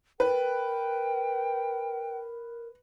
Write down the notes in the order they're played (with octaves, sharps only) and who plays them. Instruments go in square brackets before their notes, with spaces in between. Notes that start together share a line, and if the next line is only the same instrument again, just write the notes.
[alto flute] A#4 [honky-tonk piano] B4 [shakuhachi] G5